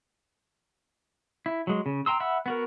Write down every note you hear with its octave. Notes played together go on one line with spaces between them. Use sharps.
E4
F#3 G#3
C#3
G5 A#5 C6 E6
E5 F#5 B5 E6
B3 F#4 A#4